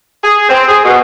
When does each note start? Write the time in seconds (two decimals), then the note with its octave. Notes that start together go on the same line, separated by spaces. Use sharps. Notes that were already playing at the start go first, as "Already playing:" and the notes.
0.23 G#4
0.49 C4
0.67 G#4
0.85 B2